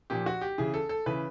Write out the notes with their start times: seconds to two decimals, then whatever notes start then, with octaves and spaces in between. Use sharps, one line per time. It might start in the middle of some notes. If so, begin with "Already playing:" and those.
0.10 A#2 F3 G4
0.26 F#4
0.41 G4
0.58 C#3 E3 G#4
0.74 A4
0.89 A4
1.06 C#3 E3 B4